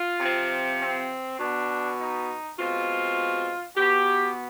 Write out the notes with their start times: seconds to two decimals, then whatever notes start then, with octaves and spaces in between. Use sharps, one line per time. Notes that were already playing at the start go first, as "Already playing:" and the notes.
Already playing: F4
0.21 C3 F3 C4
0.80 C4
1.39 B2 B3 D4
1.99 D#4
2.57 B2 G#3 C4 F4
3.76 B2 B3 G4